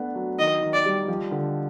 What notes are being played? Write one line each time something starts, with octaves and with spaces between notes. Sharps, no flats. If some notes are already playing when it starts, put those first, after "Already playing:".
Already playing: A3 B3 D4
F#3
D#3 D#5
D#3
D5
G3
F3
D3